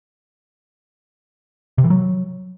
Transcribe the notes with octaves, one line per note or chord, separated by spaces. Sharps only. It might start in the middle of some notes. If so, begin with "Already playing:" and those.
C3
E3
F#3